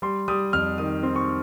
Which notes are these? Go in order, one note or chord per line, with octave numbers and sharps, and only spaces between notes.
G3 C6
G3 D#6
F2 F6
D#3 D#6
C4
C#6